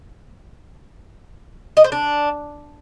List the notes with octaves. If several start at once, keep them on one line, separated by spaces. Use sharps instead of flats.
D#5
C5
D4